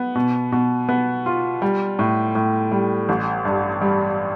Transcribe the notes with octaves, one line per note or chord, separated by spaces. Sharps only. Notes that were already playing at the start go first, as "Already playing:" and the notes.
Already playing: B3
B2
B2
B3
F4
G3
A2
A2
G3
A1
G2
G3